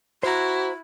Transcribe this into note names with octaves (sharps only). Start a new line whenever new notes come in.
E4 F#4 C5 A#5